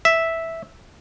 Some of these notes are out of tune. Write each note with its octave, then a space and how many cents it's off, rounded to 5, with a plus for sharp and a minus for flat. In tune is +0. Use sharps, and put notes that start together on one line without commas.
E5 -5